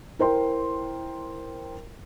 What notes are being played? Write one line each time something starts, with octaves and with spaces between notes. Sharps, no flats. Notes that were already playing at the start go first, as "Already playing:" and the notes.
E4 A#4 C5 G5 C6